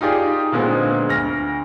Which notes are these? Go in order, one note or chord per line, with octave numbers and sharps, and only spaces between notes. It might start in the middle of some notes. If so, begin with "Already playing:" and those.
D#4 F4 G4 G#4 D5
A#2 D3 G#3 B3 C4
D2 F6 A#6